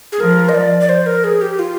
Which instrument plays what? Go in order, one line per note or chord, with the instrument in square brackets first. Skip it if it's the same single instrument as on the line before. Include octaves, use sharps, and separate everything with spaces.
[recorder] G#4
[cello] F3 [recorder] A#4
[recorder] D#5
D5
D5
C5
A#4
G#4
G4
F4